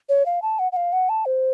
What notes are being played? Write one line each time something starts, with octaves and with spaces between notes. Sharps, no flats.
C#5
F5
A5
F#5
F#5
F5
F#5
A5
C5